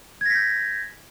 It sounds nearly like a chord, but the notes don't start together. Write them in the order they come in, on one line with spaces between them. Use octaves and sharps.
G#6 A#6 B6 G6